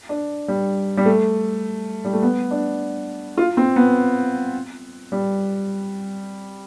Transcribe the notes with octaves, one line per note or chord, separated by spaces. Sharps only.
D4
G3
G3
A3
G3
A3
B3
D4
F4
C4
B3
G3